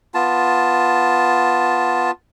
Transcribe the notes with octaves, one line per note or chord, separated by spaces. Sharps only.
B3 F4 A5